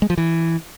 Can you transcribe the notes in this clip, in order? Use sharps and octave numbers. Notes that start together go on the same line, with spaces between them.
G#3
F3
E3